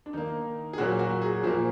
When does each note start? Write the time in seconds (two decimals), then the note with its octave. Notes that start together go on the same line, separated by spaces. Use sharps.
0.06 D4
0.13 D#3 A#3 D#4
0.73 G#4
0.78 A#2 F#3 A#3 F#4
0.99 F#4
1.22 G#4
1.43 A#2 F3 A#3 F#4